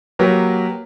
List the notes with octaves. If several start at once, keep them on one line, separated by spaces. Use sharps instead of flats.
F#3 A#3 G4 A#4 B4